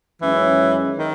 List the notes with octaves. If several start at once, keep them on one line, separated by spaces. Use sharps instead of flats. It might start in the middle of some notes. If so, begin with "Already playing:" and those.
F#2 D#3 E3 G#3 C#4
D#3